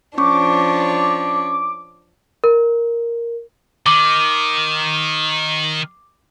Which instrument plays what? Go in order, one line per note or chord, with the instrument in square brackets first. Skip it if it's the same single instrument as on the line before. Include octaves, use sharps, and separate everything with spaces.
[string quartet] F3 D4 C#5 [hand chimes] C#4 C#6 [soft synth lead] D6
[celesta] A#4
[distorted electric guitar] D#3 [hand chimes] D6